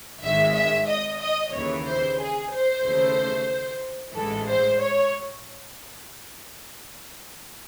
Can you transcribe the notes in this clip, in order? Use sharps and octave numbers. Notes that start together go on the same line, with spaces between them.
G#1 G#2 D#3 G#3 E5
E5
D#5
D#5
D#2 C#3 E3 C#5
C5
G#4
C5
D#2 C#3 E3 A3
A1 G#2 E3 G#3 A4
C5
C#5